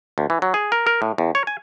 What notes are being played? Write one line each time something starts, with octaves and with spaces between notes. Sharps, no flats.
D2
E3
F#3
G#4
A#4
A#4
A2
E2
C#5
G#5